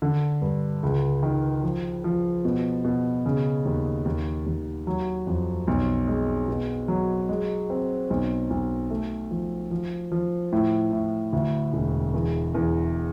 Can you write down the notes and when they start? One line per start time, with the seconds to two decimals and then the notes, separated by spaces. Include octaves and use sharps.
0.02 D3
0.42 G2
0.83 C#2
1.23 D#3
1.63 F3
2.04 F3
2.45 B2
2.85 B2
3.26 C#3
3.65 D#2
4.05 D#2
4.46 D#2
4.87 F#3
5.27 F2
5.67 B1
6.07 G#3
6.48 B2
6.88 F#3
7.29 G#3
7.70 C4
8.10 B1
8.50 B1
8.90 A3
9.31 F3
9.71 F3
10.12 F3
10.52 A2
10.93 A2
11.33 D2
11.73 E1
12.14 E2
12.54 E2